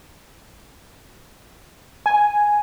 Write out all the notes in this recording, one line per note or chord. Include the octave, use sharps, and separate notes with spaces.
G#5